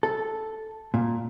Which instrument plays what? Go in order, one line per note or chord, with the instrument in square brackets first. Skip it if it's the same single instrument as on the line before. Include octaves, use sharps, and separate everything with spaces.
[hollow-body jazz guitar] A4
A#2